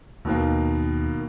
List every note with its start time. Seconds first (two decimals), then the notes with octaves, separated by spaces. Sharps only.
0.25 D#2 B2 D#3 A#3